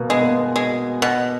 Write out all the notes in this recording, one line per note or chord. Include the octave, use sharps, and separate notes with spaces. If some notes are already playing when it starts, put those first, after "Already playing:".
Already playing: B2 A#3
G#3 B3
A#3
B3
G#3
B2